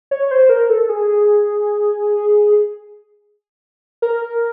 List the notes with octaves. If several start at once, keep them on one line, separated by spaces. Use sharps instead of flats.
C#5
C5
A#4
A4
G#4
A#4